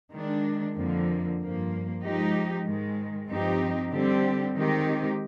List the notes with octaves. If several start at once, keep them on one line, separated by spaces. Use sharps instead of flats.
D#3 G#3 D4
F2 D3 F3 A#3
G2 F3 A#3
F3 G#3 D#4 G4
G#2 D#3 G#3
G2 F3 C4 D#4 G4
D3 G3 C4 G4
D#3 G#3 C4 D#4 G4